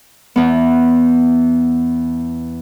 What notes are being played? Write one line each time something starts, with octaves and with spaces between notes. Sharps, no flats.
E2 B3